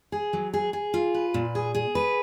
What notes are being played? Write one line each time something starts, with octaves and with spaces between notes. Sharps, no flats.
G#4
F#3
G#4
G#4
F4
B4
A#2
G#4
G#4
B4